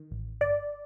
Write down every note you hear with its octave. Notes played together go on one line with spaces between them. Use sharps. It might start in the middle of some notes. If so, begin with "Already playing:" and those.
Already playing: D#3
A1
G1 D5